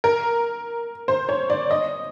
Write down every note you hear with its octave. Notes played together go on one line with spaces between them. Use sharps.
A#4
C5
C#5
D5
D#5